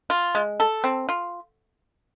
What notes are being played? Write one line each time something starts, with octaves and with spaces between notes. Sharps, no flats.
F4
G#3
A4
C4
F4